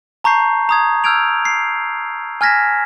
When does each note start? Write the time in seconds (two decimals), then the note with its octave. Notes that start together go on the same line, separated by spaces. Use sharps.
0.24 A5 A#5 C#6 G6 C7
0.69 A#5 D#6 G#6
1.04 E6 F6 G6 G#6 D7 F7
1.45 C7
2.41 G#5 F6 G#6 A#6 B6 E7